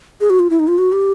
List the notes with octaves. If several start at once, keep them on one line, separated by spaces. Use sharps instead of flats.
G#4
F#4
F4
E4
D#4
F4
F#4
G4